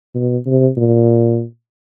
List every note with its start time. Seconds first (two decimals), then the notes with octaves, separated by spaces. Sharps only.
0.15 B2
0.46 C3
0.77 A#2